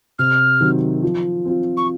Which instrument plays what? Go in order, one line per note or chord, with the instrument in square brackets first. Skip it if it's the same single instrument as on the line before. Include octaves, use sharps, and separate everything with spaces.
[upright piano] C3 [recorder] F6
[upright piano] D#3 F#3 C4
F3
C4 F4
[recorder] C#6